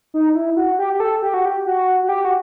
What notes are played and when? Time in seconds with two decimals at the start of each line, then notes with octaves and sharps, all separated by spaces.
0.14 D#4
0.35 E4
0.57 F#4
0.79 G4
0.93 G4
1.00 A4
1.22 G4
1.34 F#4
1.45 G4
1.66 F#4
2.03 F#4
2.09 G4
2.25 F#4